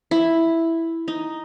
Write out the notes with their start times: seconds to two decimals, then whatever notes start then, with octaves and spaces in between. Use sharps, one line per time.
0.11 E4
1.08 D#4